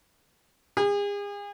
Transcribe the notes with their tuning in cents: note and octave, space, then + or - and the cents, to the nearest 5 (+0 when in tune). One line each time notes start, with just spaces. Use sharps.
G#4 -40